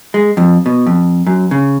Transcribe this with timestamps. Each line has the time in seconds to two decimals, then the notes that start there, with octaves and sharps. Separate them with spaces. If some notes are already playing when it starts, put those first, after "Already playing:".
0.14 G#3
0.37 F2
0.66 B2
0.87 F2
1.27 F#2
1.51 C#3